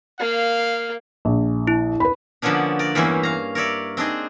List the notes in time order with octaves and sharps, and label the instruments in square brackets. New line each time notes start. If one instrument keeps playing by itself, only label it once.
[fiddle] A#3 [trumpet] F5
[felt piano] A#1
[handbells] E4
[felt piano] B4 B5
[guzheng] D3 F3 A#3 B3 C#4 D4
A#4 D5
E2 G2 E3 A#3 C#4 E5
F5 A#5
A#4 C#5 D5 E5
C4 D4 D#4 G#4